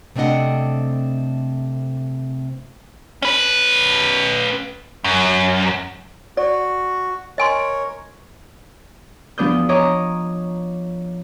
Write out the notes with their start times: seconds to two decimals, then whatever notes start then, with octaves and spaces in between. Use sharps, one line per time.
0.16 C3 A3 C4 D4 D#5 F#5
3.22 C#4 B4
5.04 F#2
6.37 F#4 D5
7.38 A#4 C#5 D#5 G#5 C6
9.38 E2 F3 B3 D4 D#6 G6
9.69 C#5 D#5 G#5 A#5 D6 D#6